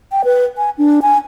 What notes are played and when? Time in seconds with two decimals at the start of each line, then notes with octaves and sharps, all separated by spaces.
0.12 G5
0.25 B4
0.58 G#5
0.78 D4
1.02 G#5